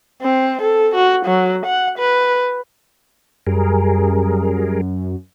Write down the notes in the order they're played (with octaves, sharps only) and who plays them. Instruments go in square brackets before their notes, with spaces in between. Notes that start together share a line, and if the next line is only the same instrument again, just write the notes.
[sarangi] C4
A4
F#4
F#3
F#5
B4
[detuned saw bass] F#2 [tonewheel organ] G3 G#4 A#4